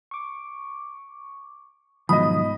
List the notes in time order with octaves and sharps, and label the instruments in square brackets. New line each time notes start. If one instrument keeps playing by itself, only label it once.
[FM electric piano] C#6 D6
[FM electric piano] G#2 B2 [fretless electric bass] D#3 F3 F#3 [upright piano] D#5 B5 [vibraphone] D#6